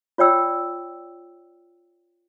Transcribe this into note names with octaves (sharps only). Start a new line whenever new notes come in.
F4 C#5 D5 G5 E6